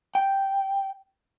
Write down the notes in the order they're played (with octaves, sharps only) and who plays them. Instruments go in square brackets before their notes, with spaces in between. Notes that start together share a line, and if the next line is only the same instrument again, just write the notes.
[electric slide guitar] G5